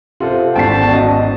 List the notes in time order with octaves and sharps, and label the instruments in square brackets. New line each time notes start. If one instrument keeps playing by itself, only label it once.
[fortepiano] C3 [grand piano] F4 A4 C5 [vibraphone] F#5
[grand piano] G#1 E2 C7 [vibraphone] C#4 D5 F#5 [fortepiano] G5 [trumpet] A5
[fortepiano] F#4 D#5